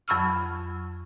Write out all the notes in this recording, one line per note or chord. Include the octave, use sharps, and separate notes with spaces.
F2 F#3 B5 C#6 E6 F6